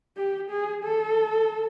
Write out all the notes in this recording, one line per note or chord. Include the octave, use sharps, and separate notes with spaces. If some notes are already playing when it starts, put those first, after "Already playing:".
G4
G#4
A4